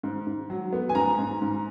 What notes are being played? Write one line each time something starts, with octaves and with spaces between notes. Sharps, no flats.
G#2
G#2
F#3
B3
G#5
G#2 A#5
G#2
G#2